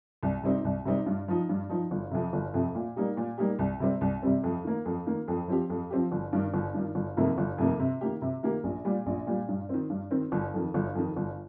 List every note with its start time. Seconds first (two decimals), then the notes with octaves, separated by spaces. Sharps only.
0.23 C2
0.43 C3 G3 C4 D#4
0.65 C2
0.85 C3 G3 C4 D#4
1.06 G2
1.28 F3 D#4
1.49 G2
1.69 F3 D#4
1.91 G1
2.11 F2 C3
2.33 G1
2.54 F2 C3
2.75 A#2
2.96 G3 A#3 D#4 G4
3.17 A#2
3.38 G3 A#3 D#4 G4
3.59 C2
3.80 C3 G3 C4
4.01 C2
4.22 C3 G3 C4
4.43 F2
4.64 D#3 A#3
4.85 F2
5.06 D#3 A#3
5.28 F2
5.48 F3 C4 G4
5.70 F2
5.90 F3 C4 G4
6.12 G1
6.33 G2 D#3
6.54 G1
6.74 G2 D#3
6.95 G1
7.17 F2 C3 D#3 A#3
7.38 G1
7.58 F2 C3 D#3 A#3
7.80 C3
8.01 D#3 A#3 G4
8.22 C3
8.43 D#3 A#3 G4
8.64 A#1
8.85 A#2 G3
9.06 A#1
9.27 A#2 G3
9.48 G2
9.69 D#3 C4
9.90 G2
10.11 D#3 C4
10.32 G1
10.54 F2 D#3
10.74 G1
10.95 F2 D#3
11.17 G1